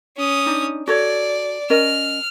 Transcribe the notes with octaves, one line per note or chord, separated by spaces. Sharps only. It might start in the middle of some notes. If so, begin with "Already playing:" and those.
C#4 D#6
D4 D#4
F#4 A4 C#5 D5
C#4 A#4 D#5 F6